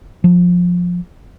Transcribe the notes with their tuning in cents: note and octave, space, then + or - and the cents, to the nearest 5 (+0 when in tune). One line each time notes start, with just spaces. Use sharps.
F3 +20